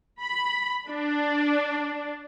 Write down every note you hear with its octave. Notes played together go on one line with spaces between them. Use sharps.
B5
D4